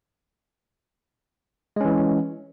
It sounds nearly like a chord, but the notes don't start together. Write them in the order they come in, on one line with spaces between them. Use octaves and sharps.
G#3 C#4 E3